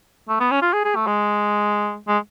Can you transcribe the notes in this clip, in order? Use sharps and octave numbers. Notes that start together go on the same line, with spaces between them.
A3
B3
C#4
F4
G#4
G#4
A3
G#3
G#3